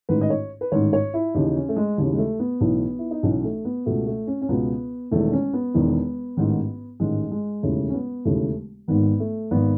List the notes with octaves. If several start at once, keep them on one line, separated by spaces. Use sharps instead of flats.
A1 G#2 D#3 B4
D#5
C#5
B4
A1 G#2 D#3 C#5
C#5
E4
D#2 C#3 E3 D#4
C#4
A3
G#3
D#2 C#3 E3
G#3
A3
B3
B1 A2 E3
E4
D#4
B1 A2 E3 C#4
A3
B3
C#2 B2 A3
A3
C#4
C#4
C#2 B2 B3
E1 E2 D#3 A3
C#4
B3
E1 E2 D#3
A1 G#2 D#3
A1 G#2 D#3 G#3
G#3
E1 D#2 C#3 E3 A3
C#4
B3
E1 D#2 C#3 E3 A3
G#1 G#2 D#3 B3
A3
G#1 D#3 B3